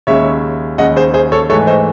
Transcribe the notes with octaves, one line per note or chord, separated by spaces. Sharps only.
D#2 C#3 G#3 C#5 E5
D#2 C#3 G#3 D#5 F#5
G#4 C5
G#4 C5
A4 C#5
G#2 E3 A3 A4 C#5
C5 D#5